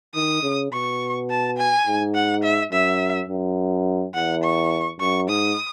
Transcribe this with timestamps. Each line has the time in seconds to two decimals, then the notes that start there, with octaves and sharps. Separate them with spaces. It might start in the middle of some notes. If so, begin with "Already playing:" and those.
0.14 D#3 D#6
0.43 C#3
0.72 B2 C#6
1.29 A5
1.57 G#5
1.87 G#2
2.14 F#5
2.43 E5
2.72 F#2 E5
3.29 F#2
4.14 E2 F#5
4.43 C#6
5.00 F#2 C#6
5.29 G#2 D#6